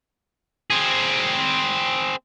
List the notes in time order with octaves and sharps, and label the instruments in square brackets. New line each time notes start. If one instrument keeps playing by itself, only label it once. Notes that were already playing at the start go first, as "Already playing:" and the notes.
[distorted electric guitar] C4 G#4